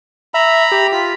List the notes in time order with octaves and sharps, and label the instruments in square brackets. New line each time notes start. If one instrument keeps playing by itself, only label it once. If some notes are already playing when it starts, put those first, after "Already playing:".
[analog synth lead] E5 [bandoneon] A#5 B5
[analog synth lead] G4
[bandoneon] F4 [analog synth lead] B6